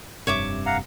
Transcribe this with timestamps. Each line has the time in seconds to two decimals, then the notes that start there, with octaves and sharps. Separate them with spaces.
0.27 F1 G2 C3 C#5 E5 D6
0.66 F5 F#5 A#5